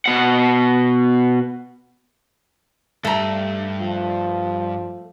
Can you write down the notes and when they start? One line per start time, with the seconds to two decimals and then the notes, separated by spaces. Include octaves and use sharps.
0.06 B2 F#5
3.05 G2 A3 A#5
3.81 F3